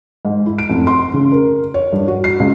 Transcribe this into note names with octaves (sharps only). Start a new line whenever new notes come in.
G#2
E4
D7
F1
C6
C#3
A#4
C#5
G2
F#4
C7
C#2